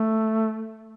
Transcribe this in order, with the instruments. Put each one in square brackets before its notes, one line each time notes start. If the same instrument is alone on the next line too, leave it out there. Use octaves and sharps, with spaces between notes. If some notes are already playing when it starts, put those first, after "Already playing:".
Already playing: [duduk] A3